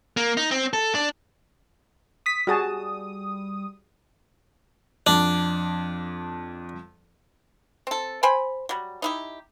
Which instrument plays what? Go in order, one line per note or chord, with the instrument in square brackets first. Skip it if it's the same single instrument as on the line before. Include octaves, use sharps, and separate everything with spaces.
[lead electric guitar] A#3
D#4
C4
A4
D4
[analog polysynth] D#6 B6
[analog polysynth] G3 D#6 [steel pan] F#4 G#4 A5
[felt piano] F2 [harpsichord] D4
[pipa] C4 A4
C5 G5 G#5 B5
F#3 G3
D#4 E4 G4